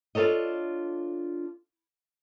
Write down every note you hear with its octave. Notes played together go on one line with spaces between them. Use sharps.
D4 F4 F#4 A4 C#5 D#5